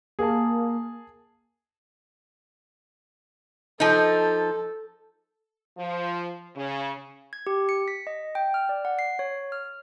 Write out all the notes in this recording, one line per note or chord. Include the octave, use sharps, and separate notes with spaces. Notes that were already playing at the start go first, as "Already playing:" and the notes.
A#3 G#4 A5
F3 D#4 A4
F3
C#3
G#6
G4
C#7
B6
D#5
G5
F6
D5
F#5
C7
C#5
F6